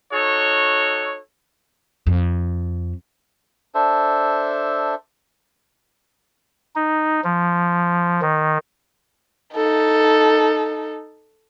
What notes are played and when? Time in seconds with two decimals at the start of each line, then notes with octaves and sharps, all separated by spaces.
0.12 D#4 F#4 A4 C#5
2.07 F2
3.75 D4 A4 C5 E5
6.75 D#4
7.24 F3
8.22 D#3
9.54 D#4 A4